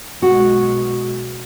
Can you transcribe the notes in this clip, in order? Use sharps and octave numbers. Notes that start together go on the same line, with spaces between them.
B1 B2 G#3 F#4